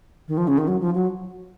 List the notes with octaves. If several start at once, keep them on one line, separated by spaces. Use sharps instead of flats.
D#3
F3
C#3
D#3
F#3
F3
F#3